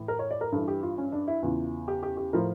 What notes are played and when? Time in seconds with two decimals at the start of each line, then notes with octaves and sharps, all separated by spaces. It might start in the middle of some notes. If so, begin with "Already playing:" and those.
Already playing: A2 E3
0.08 A#4
0.19 C#5
0.31 D5
0.41 A#4
0.52 G2 E3 A4
0.68 G4
0.83 F4
0.98 C#4
1.12 D4
1.28 E4
1.43 E2 C#3 E3 F4
1.88 G4
2.03 G4
2.17 G4
2.33 A2 F3 A#4